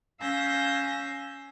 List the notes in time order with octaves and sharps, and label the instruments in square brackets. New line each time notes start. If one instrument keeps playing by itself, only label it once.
[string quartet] C#4 F5 G#5 E6 G6 A#6